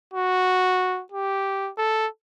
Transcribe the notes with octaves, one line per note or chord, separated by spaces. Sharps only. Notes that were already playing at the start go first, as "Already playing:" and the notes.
F#4
G4
A4